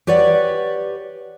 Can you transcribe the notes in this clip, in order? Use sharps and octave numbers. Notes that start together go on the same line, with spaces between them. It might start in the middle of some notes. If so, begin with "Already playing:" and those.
G4 B4 C#5 D5 F#5